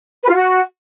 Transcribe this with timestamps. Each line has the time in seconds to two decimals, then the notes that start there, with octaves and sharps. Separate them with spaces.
0.23 B4
0.28 F4
0.34 F#4